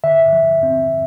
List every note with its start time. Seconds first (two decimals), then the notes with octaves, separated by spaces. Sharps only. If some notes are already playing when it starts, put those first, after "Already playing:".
0.04 D3 E5
0.33 F3
0.63 C4